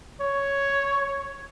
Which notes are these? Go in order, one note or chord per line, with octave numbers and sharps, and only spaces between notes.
C#5